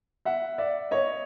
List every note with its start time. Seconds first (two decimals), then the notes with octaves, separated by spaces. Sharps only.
0.25 E5 F#5
0.58 D5 E5
0.91 C#5 D#5